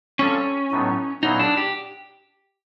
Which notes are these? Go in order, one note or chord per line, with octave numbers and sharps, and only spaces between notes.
G3 C4 C#4 F4 A4
A2 F#3 B3 D#4
A#2 F#3 B3 D#4 E4 G#4
D4
G4